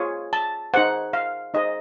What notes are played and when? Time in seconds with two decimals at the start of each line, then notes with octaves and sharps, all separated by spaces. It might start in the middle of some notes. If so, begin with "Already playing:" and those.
Already playing: F4 G#4 C#5
0.33 A5
0.74 D#4 G#4 C5 F#5
1.13 F5
1.54 D#4 G#4 C5 D#5